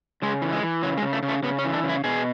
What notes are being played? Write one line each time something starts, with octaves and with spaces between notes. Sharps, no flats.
C#3 G#3
E3
G#3
E3
C#3 F#3
G#3
C#3
A3
C#3
A3
C#3 B3
C#4
E3
D4
C#3
E4
B2 G#4